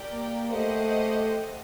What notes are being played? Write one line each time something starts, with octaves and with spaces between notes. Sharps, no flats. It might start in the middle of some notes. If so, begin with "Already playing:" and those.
Already playing: G4 A#4 D5 G5
A#3
A3 G4 C5 D#5 F#5